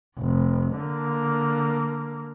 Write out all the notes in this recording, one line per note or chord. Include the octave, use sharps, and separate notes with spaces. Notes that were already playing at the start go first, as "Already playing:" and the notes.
F1
D3 A#3